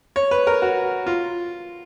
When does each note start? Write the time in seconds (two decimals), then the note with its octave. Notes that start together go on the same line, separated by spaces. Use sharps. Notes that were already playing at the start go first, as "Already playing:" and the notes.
0.16 C#5
0.31 B4
0.47 A#4
0.62 F#4
1.07 F4